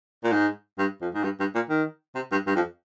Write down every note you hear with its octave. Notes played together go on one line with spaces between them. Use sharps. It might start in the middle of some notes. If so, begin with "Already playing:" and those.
A#2
G#2
G2
F2
G#2
G2
G2
A#2
D#3
C3
G2
G2
F2